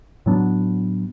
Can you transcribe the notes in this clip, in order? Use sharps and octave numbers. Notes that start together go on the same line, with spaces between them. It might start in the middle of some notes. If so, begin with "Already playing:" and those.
A2 F#3 B3 D4